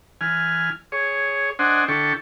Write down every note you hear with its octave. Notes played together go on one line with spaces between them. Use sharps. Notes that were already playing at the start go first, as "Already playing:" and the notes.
E3 G#5 F6
G#4 C#5
D4 C5 D#5 F#5 G#5
D3 E4 A4 G5 C#6